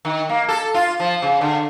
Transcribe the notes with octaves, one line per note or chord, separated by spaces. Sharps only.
D#3
A#3
A4
F4
F3
C#3
D3